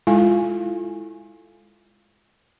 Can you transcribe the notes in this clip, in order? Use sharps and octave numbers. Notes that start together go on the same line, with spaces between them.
G#3 E4 F4 A4 F5 G#5